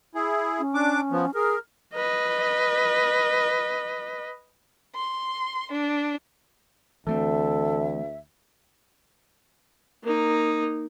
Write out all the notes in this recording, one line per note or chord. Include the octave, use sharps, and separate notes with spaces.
E4 G#4
C#4
D4 D6
F3 B3
G#4 A#4
B4 D#5
C6
D4
D2 E3 A3 C4 A4 E5
A#3 D#4